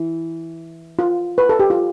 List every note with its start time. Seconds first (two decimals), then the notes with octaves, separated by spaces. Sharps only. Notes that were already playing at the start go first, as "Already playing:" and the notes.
Already playing: E3
0.99 F4
1.38 B4
1.49 A4
1.59 G4
1.70 F4